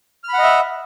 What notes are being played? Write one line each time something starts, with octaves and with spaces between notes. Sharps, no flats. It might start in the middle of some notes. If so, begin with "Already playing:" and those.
D#5 E5 F#5 B5 F6